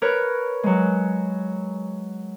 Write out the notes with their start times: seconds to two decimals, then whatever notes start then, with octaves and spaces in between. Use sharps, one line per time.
0.02 A#4 B4 C#5
0.63 F#3 G#3